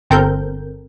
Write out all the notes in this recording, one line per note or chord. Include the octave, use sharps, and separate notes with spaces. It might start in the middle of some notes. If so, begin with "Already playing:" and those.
G1 C4 A4 A#4 G6